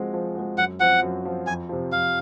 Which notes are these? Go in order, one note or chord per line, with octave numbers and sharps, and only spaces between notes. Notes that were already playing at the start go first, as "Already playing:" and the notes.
Already playing: F3 G#3 C4 F#4
F3
G#3 C4 F#4
F#2 F#5
F3 C4 F#4 F#5
F#2
F3 C4 F#4
F2 G#5
C3 F3
F2 F5